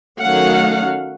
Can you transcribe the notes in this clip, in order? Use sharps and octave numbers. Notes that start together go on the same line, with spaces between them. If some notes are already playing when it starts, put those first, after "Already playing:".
D#3 F#3 A3 C#4 F5 F#5